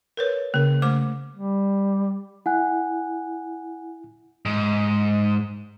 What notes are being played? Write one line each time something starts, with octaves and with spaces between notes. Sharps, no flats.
A#4 B4 C#5
C#3 A#3 A#4
A3 C5 D6
G3
E4 F#5 G#5 F#6
G#2